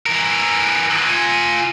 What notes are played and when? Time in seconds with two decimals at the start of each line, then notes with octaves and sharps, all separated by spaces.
0.06 E3 A#4
1.06 F4 G#5